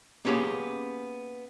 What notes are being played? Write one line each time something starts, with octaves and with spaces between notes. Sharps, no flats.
A#3 B3 C#4 G4 G#4